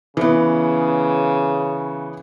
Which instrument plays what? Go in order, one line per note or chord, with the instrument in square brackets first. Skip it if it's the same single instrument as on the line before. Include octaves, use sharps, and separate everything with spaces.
[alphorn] C#3 [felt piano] E3 B3